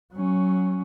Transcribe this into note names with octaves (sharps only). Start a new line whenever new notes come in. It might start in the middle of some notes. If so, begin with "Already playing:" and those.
F#3 C#4